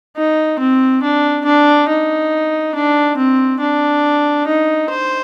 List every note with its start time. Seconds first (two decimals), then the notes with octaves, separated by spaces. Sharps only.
0.16 D#4
0.59 C4
1.03 D4
1.45 D4
1.88 D#4
2.75 D4
3.17 C4
3.60 D4
4.47 D#4
4.89 C5